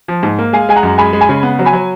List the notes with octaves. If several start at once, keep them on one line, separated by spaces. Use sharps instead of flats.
F3
G#2
A#3
G#3 F5 G#5
G#3 G#5
F#5 A#5
F#2
G#3 G#5 B5
G#3
G#5 B5
C#3
B3
F#3
G#5 B5
F#3